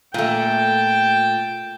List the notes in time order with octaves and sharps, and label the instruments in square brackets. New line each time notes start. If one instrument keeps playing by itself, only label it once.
[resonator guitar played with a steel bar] A#2 A3 [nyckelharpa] G5 A5